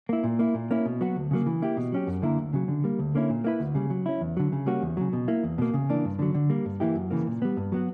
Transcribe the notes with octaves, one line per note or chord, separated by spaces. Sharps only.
A#3 E4
A#2
A#3 E4
A#2
A#3 C#4 E4
B2
F#3 B3 F#4
D2
C#3 F#3 A#3
E3
A#3 E4 G4
B2
F#3 C#4 G4
F#2
D3 A#3 E4 A#4
D2
C#3 F#3
D3
G3 A#3
D2
D3 A#3 C#4 E4
A#2
A#3 E4 B4
D2
C#3 G3
F#3
C#4 E4
E2
D3 F#3
C#3
G3 A#3 C#4 F#4
E2
C#3 F#3
B2
A#3 E4
E2
B2 A#3
C#3
E3 A#3 D4
G2
D3 F#3
D3
G3 A#3
G2
E3 A#3 E4 G4
F#2
C#3 E3 A#3
A#2
G3 B3
G2
F#3 B3 F#4